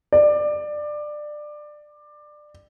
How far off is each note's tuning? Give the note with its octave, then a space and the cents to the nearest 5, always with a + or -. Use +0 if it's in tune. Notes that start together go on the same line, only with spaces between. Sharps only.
D5 +20